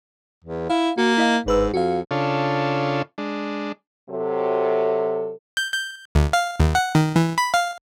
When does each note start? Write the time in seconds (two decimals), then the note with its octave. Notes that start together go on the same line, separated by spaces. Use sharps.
0.45 E2
0.70 E4 F5
0.98 A#3 F#4
1.18 E4 D#5 F5
1.46 G1 G#2 B4 E6
1.74 F2 F#4 F5
2.11 C#3 D4 F4 A4 C#5
3.18 G#3 D4
4.10 C3 F#3 A4
5.57 G6
5.72 G6
6.15 D2
6.33 F5
6.60 D#2
6.75 F#5
6.95 D#3
7.16 E3
7.38 B5
7.54 F5